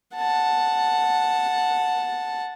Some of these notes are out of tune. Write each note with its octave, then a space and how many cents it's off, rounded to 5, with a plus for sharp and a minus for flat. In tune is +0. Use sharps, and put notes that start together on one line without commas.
F#5 -10 A5 +0